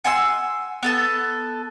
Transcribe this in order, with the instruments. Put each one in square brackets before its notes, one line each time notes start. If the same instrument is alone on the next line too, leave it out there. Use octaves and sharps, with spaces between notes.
[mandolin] F#5 G#5 C6 E6
B3 A4 A5